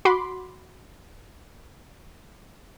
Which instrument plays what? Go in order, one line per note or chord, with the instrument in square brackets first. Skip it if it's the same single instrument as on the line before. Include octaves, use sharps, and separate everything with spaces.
[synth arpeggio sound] F#4 B5 C6 D6